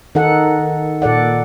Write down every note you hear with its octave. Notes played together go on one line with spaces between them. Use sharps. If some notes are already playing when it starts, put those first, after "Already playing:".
D#3 D#4 A4 F#5
A#2 A4 D5 F#5